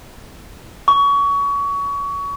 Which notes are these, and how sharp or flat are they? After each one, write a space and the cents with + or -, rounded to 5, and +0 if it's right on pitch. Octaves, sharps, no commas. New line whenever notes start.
C#6 +25